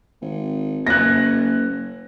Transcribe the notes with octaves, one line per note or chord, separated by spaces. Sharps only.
G#1
F#1 A#3 C#4 G#5 F#6 A#6